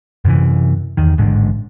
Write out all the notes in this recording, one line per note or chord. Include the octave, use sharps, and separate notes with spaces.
F#2 C3 E3
E2 D#3
A1 G#2 D3